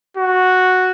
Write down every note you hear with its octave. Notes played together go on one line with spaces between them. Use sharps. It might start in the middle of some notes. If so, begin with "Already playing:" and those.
F#4